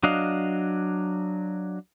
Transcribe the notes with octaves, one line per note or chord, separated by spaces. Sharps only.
F#3 D4 D#5 F5